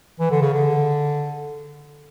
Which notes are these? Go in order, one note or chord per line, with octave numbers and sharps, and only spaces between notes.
E3
D3
C#3
D3